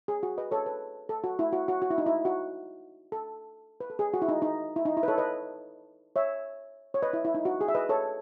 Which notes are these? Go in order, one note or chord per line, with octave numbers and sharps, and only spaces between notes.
G#4
F#4
B4 D#5
A4 C#5
B4
A4
F#4
E4
F#4
F#4
F#4
E4
D#4
E4
F#4
A4
B4
A4
G#4
F#4
E4
D#4
D#4
E4
D#4
E4
B4
A4 C#5
B4 D#5
C#5 E5
C#5
B4 D#5
E4
E4
D#4
F#4
G#4
E5
B4 D#5
A4 C#5